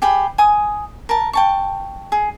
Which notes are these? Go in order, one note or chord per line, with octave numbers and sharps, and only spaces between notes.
G4 G#4 G5 B5
G#5 D#6
A#4 A5
G5 A5 C#6
G#4